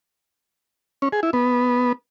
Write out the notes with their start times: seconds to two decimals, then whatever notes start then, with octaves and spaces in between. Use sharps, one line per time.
1.02 C#4
1.13 G#4
1.23 E4
1.33 B3